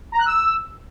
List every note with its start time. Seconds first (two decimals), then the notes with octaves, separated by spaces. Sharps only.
0.12 A#5
0.19 F#6
0.26 E6